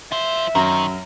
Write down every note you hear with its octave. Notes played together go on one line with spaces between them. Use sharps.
F4 C5 E5
F#2 D#3 A#5